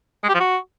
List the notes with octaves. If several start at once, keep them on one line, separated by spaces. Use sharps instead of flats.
G#3
G4
F3
F#4